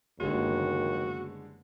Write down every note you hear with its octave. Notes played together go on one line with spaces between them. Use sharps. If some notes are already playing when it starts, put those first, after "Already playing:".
F#1 D#2 D3 G3 G#3 B3 F#4